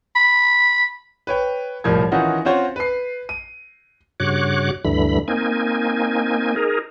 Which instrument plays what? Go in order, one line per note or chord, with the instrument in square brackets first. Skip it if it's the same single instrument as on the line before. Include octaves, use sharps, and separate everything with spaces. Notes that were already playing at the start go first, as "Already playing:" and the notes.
[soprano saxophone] B5
[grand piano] B4 C#5 G5
E1 C2 A2 F3 A#4 G#6
D#3 E3 C#4 D#4 F4 F#4
C4 C#4 F4 F#4 C5 C#5
B4 C7
D#7
[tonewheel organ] G2 C#3 F#4 C#5 D6 F#6
D2 G2 D3 E3 B5
A#3 C4 D#4 G#5
D#4 G#4 A#4